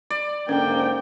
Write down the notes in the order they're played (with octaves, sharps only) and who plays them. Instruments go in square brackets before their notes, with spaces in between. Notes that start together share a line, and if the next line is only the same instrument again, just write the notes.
[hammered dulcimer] D5
[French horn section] G#2 D3 A#3 [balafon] C#4 [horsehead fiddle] G5